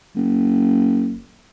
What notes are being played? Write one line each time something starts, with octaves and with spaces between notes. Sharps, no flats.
F#1